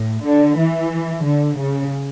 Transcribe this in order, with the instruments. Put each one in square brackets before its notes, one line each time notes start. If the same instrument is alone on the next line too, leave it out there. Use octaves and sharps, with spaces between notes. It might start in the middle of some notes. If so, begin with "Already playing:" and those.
Already playing: [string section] A2
D3
E3
D3
C#3